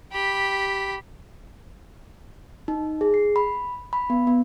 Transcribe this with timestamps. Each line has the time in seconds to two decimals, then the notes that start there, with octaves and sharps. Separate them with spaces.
0.12 G4 B5
2.68 D#4
3.01 G#4
3.14 C7
3.36 B5
3.93 B5
4.10 B3
4.27 B3